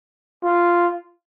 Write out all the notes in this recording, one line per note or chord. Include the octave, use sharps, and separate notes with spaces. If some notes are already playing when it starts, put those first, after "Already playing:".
F4